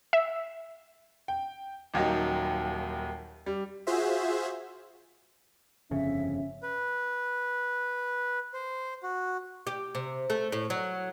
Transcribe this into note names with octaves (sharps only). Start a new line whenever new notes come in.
E5
G5
D#1 D#2 F#3 D#4
G3
F4 F#4 G#4 C5 E5
G1 F2 C#3 C#4 E5
B4
C5
F#4
G4
C3
A3
A2
F#3